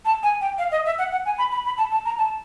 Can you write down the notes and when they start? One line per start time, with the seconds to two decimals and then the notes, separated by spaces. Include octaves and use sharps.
0.05 A5
0.23 G#5
0.41 G5
0.58 F5
0.72 D#5
0.86 E5
0.99 F#5
1.12 F#5
1.25 G#5
1.38 B5
1.52 B5
1.65 B5
1.78 A5
1.92 A5
2.05 A#5
2.18 A5